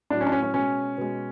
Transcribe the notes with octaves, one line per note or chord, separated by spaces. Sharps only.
A2 F#3 D4
C#4
D4
C#4
C#4
B2 G#3 C#4
B2 G#3